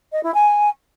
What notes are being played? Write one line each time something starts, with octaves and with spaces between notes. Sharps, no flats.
D#5
E4
G#5